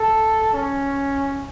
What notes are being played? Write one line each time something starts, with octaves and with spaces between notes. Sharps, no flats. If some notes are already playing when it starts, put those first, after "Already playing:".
Already playing: A4
C#4